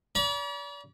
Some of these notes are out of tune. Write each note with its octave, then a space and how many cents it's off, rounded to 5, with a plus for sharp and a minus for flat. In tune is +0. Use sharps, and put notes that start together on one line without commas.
D5 -40 B5 -45